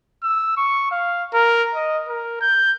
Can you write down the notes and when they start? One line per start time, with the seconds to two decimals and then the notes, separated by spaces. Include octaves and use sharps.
0.23 E6
0.57 C#6
0.92 F5
1.34 A#4
1.74 D#5
2.08 A#4
2.41 G6